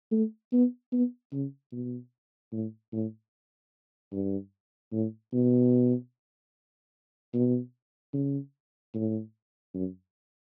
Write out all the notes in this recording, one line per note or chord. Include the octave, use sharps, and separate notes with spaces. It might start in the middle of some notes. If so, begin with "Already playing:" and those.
A3
B3
B3
C#3
B2
A2
A2
G2
A2
B2
B2
C#3
A2
F#2